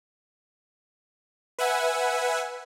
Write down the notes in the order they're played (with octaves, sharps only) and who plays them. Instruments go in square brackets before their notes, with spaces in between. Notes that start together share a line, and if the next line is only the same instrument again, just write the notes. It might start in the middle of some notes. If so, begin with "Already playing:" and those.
[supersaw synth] B4 E5 F#5 G#5